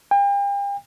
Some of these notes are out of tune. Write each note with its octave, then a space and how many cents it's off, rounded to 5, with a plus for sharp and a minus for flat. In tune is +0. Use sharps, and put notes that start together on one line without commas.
G5 +40